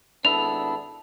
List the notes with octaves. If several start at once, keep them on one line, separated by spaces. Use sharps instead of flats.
G#1 B3 D4 E4 A4 F7